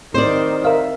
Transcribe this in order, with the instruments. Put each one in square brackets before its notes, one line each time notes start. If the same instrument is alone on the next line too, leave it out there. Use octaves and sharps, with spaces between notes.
[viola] D#3 [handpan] C4 [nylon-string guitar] C5 D5
[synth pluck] A#4 F5 [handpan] E5